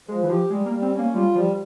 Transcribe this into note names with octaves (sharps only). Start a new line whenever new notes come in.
F3 G#3
E3
F3 G4
G3 G#3
A#3
G3
C4
C#4
A#3
G3 F4
F3 G3